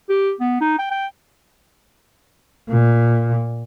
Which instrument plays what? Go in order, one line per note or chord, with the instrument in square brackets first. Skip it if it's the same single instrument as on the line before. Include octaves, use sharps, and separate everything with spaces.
[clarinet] G4
B3
D#4
G5
G5
[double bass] A#2